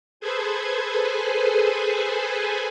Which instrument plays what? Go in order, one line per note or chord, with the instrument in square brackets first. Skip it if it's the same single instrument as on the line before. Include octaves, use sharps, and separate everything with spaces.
[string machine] G#4 A4 B4 C5 G#5